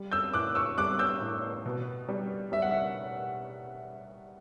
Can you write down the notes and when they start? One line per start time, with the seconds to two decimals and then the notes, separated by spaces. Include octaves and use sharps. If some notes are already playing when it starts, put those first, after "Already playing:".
Already playing: G3
0.12 E6 G6
0.33 A2 D6 F#6
0.55 C#6 E6
0.78 G3 D6 F#6
0.99 E6 G6
1.22 A2
1.66 B2
2.09 G3
2.52 G3 E5
2.62 F#5
2.71 E5